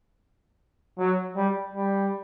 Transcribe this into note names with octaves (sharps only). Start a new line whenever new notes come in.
F#3
G3
G3